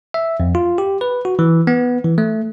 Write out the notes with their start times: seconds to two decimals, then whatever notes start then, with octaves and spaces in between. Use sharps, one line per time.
0.14 E5
0.40 F2
0.55 F4
0.78 G4
1.01 B4
1.25 F#4
1.39 E3
1.67 B3
2.04 E3
2.18 A3